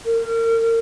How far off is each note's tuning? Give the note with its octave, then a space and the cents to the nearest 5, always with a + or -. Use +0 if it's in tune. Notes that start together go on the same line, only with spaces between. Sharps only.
A#4 -30